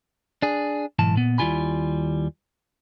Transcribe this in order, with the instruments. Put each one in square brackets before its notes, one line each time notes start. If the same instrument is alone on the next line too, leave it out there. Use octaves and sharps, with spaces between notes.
[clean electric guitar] D4 G#4
B1 G#2 E3 A5
A#2 B3
D#2 G3 E4 F4 G#5 B5